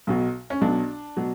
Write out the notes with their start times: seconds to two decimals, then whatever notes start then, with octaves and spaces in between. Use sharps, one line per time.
0.07 B1 B2 F#3
0.50 C#4
0.61 B1 B2 F#3 D4
1.17 B2 F#3